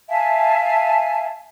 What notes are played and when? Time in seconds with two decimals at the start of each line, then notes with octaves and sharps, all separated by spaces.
0.09 E5 F5 G#5 A5